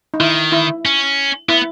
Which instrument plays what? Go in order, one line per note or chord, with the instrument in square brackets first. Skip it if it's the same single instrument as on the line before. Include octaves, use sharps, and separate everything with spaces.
[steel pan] D#4
[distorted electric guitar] D#3 [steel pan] E4
[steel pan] E4
[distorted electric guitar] C#4
[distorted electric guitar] B3 [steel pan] E4